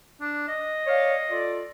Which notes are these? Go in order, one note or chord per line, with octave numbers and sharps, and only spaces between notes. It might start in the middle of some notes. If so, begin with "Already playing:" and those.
D4
D#5
C#5 D5 F5
F4 A4 D5